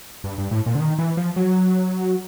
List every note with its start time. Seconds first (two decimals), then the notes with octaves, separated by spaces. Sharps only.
0.24 G2
0.38 G2
0.51 A2
0.66 A#2
0.75 D3
0.80 D#3
0.99 E3
1.17 F3
1.36 F#3